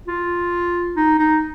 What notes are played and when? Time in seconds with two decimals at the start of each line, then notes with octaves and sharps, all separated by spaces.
0.08 F4
0.96 D#4
1.19 D#4